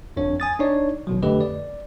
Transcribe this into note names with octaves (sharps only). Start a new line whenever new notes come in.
G1 F2 D4 C#5
G#5 D#6 A6
D4 D#4 C#5 D5
G#1 B2 F#3
F2 D3 A3 G4 B4 D#5
D5